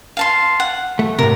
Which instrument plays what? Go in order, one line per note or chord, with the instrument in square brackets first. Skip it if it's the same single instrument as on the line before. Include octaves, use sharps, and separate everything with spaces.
[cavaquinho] F5 A5 C6
F#5
[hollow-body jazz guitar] A3
[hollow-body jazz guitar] A2 C3 [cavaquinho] A#4